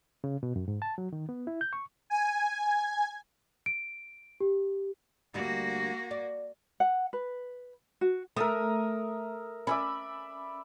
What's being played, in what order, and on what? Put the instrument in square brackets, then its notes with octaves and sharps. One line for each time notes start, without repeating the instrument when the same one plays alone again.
[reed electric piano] C#3
B2
F#2
G#2
A5
F#3
D#3
B3
E4
G6
C#6
[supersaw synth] G#5
[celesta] D7
G4
[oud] D2 G3 D5 [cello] A#3 F#4
[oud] D5
[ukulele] F#5
B4
F#4
[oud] A3 [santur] A#4 E5 D#6
[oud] C#4 [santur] D5 E5 B5